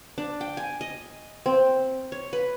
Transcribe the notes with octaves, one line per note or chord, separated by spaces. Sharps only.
D4
G5
G#5
D#5
C4
C#5
B4